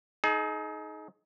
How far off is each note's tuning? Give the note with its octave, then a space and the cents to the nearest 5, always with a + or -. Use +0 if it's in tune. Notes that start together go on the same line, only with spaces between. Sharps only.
D#4 +10 G#4 +40